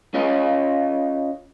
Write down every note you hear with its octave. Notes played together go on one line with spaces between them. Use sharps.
C#4 F4 C#5 D#5